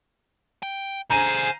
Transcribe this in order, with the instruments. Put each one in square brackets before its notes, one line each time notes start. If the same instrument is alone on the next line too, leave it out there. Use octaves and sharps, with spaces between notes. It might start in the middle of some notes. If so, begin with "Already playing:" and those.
[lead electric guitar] G5
[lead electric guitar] D3 G#4 [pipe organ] C5 F5 G#5 [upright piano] A#5 D#7